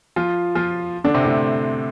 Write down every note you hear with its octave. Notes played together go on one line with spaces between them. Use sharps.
F3 F4
F3 F4
D3 D4
C3 C4
A2 A3